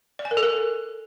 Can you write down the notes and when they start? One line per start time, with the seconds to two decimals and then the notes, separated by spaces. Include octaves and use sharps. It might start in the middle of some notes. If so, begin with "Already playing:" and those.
0.19 D5
0.25 G#5
0.31 A#4
0.37 A4
0.43 A#4